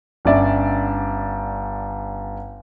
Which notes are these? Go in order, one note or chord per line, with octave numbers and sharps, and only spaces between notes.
G1 C#4 D4 D5 E5